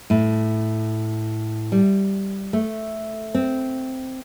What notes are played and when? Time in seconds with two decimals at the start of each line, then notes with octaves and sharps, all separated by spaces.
0.10 A2
1.72 G3
2.53 A3
3.34 C4